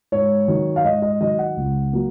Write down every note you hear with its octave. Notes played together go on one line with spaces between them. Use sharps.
G#2 C#5
D#3 F#3
F5
G#2 D#5
D#5
D#3 F#3 D#5
F#5
C#2
F#3 A#3